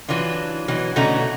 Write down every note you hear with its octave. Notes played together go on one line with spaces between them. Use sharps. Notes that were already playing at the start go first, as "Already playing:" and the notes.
E3 F#3 D4 F4
B2 E3 F#3
B2 D3 A3 C#4 F#4 A#5